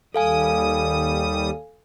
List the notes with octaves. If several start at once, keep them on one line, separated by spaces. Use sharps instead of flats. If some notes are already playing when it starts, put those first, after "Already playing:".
D#2 G3 A4 F5 G#5 D#6